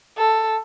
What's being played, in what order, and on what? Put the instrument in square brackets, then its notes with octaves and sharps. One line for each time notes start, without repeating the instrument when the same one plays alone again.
[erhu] A4